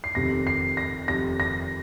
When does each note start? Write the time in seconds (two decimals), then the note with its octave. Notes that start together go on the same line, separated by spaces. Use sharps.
0.04 C7
0.15 F1 F2 C3 D#3 A#6
0.47 C7
0.77 A#6
1.08 F1 F2 C3 D#3 A#6
1.40 A#6